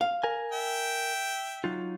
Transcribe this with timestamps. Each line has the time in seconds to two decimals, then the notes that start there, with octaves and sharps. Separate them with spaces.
0.01 F5
0.24 A#4 G#5
0.52 E5 G5
1.64 F#3 D#4 F4